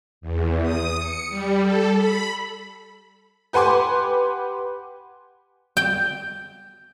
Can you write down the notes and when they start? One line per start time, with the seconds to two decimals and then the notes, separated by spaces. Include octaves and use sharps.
0.21 E2
0.62 D#6
0.97 C#7
1.29 G3
1.61 A4
1.94 B5
3.53 G4 B4 F#5 G#5 C6 D6
5.77 G5